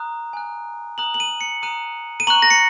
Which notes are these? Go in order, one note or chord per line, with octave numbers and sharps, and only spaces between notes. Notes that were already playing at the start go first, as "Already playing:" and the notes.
Already playing: A#5 D#6 F#6
G#5 F#6
A#5 D#6 F#6 F#7
F#7
D#7
C#7
A#5 D#6 F#6 D#7
D#7
A#5 C#6 F#6 F#7
A#6
C#7